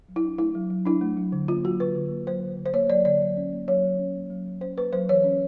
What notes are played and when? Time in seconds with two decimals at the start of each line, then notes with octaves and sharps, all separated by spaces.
0.08 F#3
0.16 E4
0.24 D4
0.38 A3 E4
0.55 F#3
0.70 F#3
0.85 D4 E4
1.01 A3
1.17 F#3
1.32 D3
1.48 A#3 F4
1.64 F#3 F#4
1.80 D3 B4
1.95 D3
2.11 A#3
2.27 F#3 C5
2.43 D3
2.58 D3
2.66 C5
2.73 A#3 C#5
2.90 F#3 D5
3.05 D3 D5
3.21 F#3
3.37 C#4
3.53 A#3
3.68 F#3 C#5
3.84 F#3
3.99 C#4
4.15 A#3
4.30 F#3
4.46 F#3
4.61 C#4 C5
4.77 A#3 B4
4.93 F#3 C5
5.09 E3 C#5
5.24 C#4